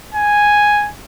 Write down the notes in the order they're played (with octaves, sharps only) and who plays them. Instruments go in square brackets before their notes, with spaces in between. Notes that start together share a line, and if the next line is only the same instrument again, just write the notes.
[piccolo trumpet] G#5